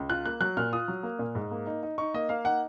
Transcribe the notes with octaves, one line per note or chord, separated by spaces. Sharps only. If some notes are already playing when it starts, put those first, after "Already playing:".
Already playing: C#2
F4 F#6
A#3 F#6
F#3 F#6
A#2 F6
F4 D#6
F#3
A#3
A#2
G#2
A#3
D#4
D#4
D#4 C#6
A#3 D#5
A#3 F5
D#4 F#5